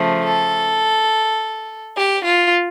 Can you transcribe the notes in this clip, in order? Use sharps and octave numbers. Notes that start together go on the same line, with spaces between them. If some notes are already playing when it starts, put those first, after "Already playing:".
Already playing: C#3 F3 A3
A4
G4
F4